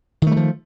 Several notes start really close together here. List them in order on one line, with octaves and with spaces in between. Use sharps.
D#3 A3 G3 F3